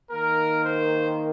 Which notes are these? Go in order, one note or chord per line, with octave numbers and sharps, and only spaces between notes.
D#3 A#3 A#4
C5